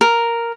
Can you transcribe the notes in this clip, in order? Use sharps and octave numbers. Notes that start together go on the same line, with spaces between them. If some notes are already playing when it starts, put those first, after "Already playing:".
A#4